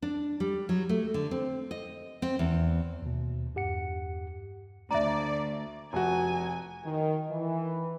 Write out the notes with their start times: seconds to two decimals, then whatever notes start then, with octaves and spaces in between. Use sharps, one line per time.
0.02 D4
0.40 G3
0.69 F#3
0.89 A3
1.14 D3
1.31 C4
1.71 D#5
2.22 C4
2.39 E2
3.02 D#2 B2
3.55 E2 G2 G4 F#5 C#7
4.91 D2 D5 E5 A#5
5.93 F1 F#4 G#5
6.85 D#3
7.29 E3